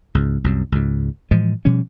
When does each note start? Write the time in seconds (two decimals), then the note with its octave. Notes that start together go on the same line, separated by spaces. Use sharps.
0.15 C#2 G#2
0.44 C2 F#2
0.72 C#2 G#2
1.31 A2 E3 F3 G#3
1.65 B2 F3 G3 C#4